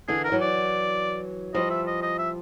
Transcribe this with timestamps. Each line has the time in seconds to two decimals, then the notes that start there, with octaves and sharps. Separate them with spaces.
0.08 D3 E3 G#4
0.24 A#4
0.32 E3 F#3
0.41 D5
1.54 F3 G3 D#5
1.70 E5
1.87 D#5
2.02 D#5
2.18 E5